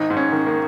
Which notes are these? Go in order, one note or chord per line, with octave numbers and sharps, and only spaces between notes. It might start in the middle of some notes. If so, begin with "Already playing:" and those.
Already playing: G#1 D#4
G#2
C#4
D#3
A#3